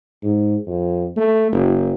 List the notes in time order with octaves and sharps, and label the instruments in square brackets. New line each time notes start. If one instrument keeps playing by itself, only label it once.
[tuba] G#2
F2
A3
F#1